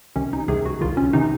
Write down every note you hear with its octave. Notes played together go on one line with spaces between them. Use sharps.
C2 C3 D#3 C#4
D#4
C2 C3 D#3 G#4
F#4
C2 C3 D#3 F4
C#4
C3 D#3 D#4